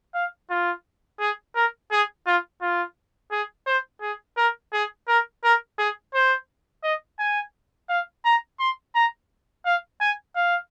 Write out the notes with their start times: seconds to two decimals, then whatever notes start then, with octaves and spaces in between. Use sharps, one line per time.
0.14 F5
0.50 F4
1.20 G#4
1.55 A#4
1.92 G#4
2.26 F4
2.61 F4
3.32 G#4
3.67 C5
4.02 G#4
4.37 A#4
4.73 G#4
5.08 A#4
5.44 A#4
5.79 G#4
6.14 C5
6.83 D#5
7.19 G#5
7.89 F5
8.25 A#5
8.59 C6
8.95 A#5
9.65 F5
10.01 G#5
10.36 F5